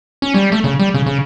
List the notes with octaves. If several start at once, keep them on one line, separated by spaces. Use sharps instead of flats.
C#4
G3
A3
C#3
G3
C#3
C#3